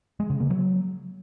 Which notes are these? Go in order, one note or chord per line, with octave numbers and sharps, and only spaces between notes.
G#3
C#3
A#3
F#3